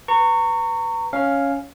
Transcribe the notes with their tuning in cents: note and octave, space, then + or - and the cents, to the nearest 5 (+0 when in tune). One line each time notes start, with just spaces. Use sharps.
B4 +0 A#5 -30 C#6 +0
C#4 +0 F5 +0